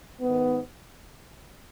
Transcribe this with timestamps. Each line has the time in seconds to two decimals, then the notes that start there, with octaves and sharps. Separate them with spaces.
0.20 G#2 B3
0.26 D#3